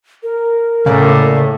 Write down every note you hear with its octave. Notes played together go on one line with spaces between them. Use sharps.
A#4
A2 C#3 A#3 D5